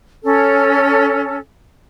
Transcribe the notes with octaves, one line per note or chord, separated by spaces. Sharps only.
C#4 A4